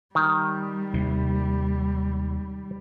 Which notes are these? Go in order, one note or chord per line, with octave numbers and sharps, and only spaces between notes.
D#3 G3
D#2 C3